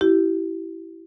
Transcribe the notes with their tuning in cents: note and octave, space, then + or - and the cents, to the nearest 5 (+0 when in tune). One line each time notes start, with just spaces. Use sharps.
E4 +0 G4 -30